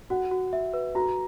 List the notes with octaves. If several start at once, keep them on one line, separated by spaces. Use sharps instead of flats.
F#4 F#5
F#4
E5
B4
F#4 A#5